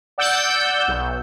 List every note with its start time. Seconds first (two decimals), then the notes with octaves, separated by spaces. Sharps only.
0.18 D5 F#5 E6 G6
0.88 B1